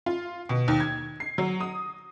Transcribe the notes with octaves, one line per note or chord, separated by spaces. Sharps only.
F4
B2
D#2
G#6
C7
F#3
D#6